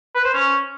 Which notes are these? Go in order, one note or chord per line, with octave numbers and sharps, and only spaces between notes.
B4
C5
C#4